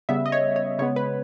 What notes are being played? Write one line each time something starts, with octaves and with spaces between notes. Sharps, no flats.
C#3 G3 B3 E5
D#5
C#5
C#5
C#3 G#3 B3 C#5
B4